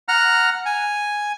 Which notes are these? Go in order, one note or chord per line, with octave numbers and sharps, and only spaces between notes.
F#5 A#5 F6
G#5